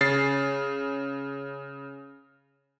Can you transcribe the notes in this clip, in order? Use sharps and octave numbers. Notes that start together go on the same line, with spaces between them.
C#3 A6 C7